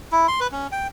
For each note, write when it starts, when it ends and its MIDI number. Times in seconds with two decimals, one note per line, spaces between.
0.12 0.27 64
0.28 0.40 84
0.40 0.47 71
0.52 0.67 61
0.72 0.87 79